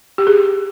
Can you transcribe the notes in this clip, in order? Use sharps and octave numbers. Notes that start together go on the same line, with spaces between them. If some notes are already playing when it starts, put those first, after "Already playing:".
G4
G#4